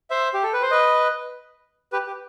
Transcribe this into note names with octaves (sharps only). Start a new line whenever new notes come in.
C5 E5
G4
A4
B4
C5
B4 D#5
G4 B4
G4